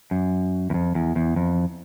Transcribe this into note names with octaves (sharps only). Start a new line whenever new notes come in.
F#2
E2
F2
E2
E2
F2